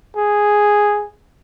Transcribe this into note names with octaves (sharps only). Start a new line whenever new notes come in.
G#4